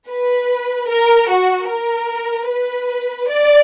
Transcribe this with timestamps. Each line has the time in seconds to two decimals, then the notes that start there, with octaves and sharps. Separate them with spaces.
0.09 B4
0.89 A#4
1.29 F#4
1.68 A#4
2.48 B4
3.29 D5